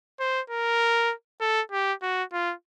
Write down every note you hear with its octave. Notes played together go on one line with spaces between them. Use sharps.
C5
A#4
A4
G4
F#4
F4